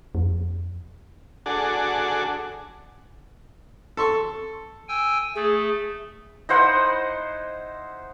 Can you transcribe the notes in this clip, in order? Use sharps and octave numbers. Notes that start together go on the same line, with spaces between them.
F2
D4 F#4 G#4 A4
A4 C6 C#6
G5 G#5 E6
A3 G#4
D#4 E4 C5 F#5